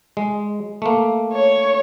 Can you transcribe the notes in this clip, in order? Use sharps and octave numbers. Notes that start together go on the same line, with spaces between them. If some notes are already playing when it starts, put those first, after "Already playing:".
G#3
A3 A#3
C#5